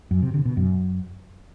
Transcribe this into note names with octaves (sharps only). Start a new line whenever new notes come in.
F#2
C3
D3
B2
F#2